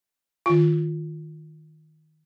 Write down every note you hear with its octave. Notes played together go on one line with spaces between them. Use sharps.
D#3 F4